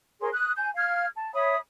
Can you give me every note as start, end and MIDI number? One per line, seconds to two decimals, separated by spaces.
0.20 0.29 68
0.20 0.29 70
0.20 0.29 73
0.20 0.29 84
0.33 0.51 87
0.33 0.51 90
0.57 0.70 80
0.57 0.70 91
0.75 1.06 77
0.75 1.06 89
0.75 1.06 92
1.15 1.33 81
1.34 1.56 73
1.34 1.56 76
1.34 1.56 83
1.34 1.56 87